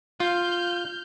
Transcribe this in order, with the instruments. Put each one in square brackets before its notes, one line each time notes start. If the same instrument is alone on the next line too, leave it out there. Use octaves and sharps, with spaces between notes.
[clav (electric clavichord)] F4 [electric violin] F6 G6